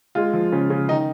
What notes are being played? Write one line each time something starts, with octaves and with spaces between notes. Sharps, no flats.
G#3 F4
F3
C#3
C#3
D#3 D#4